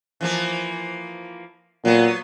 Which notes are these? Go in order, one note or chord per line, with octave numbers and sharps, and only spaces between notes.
E3 F3 A#3
A#2 F#3 B3